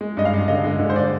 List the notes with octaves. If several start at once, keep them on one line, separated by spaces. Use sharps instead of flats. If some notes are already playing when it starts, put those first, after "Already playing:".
G#3
G2 D#5
F5
G2
D3 D#5
G#3
D3
C5
D5